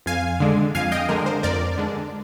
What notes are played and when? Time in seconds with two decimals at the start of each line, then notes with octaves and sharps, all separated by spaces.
0.06 F2 F5 G#5
0.40 D3 G#3 D4
0.75 F2 F5 G#5
0.92 D#5 G5
1.09 D3 G#3 D4 A#4
1.26 C5
1.43 F2 A#4 D5
1.78 D3 G#3 D4